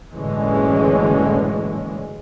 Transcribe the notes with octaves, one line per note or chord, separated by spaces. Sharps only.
F#1 A2 D3 E3 G#3 C#4